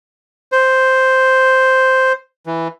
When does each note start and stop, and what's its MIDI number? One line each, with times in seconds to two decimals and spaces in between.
0.52 2.13 72
2.46 2.68 52